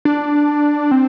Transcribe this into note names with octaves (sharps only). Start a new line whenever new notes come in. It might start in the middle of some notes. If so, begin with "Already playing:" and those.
D4
C4